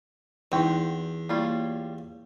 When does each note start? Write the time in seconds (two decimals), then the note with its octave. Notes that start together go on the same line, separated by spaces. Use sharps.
0.52 E2 C4 D#4 E4 F#4 G5
1.29 G3 A3 A#3 E4 F4 C#5